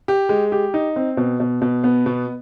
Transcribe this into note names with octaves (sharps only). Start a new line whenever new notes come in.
G4
G#3
G4
D#4
C4
B2
B2
B2
B3
B2